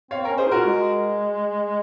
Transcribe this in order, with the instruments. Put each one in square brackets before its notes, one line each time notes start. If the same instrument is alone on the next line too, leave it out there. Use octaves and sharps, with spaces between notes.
[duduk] C4 [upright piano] C#5 F5
[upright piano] A#4 C#5
[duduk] C#4
[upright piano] G#4 C5
[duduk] F4 [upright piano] F#4 A#4
[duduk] G#3